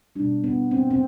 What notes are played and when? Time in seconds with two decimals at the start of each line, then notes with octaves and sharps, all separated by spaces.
0.16 B2 G3 D4
0.44 B3
0.71 C4
0.90 C4